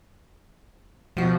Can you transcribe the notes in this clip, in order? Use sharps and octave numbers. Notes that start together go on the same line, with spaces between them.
B2 F3 F#4